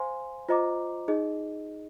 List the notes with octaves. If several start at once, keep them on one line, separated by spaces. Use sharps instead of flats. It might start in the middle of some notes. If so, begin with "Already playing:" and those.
Already playing: C5 F5 G#5 C6
F4 C5 D#5 A#5 D6
D#4 G#4 D#5